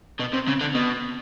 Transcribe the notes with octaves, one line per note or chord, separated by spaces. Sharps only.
B2
C3
C#3
D3
B2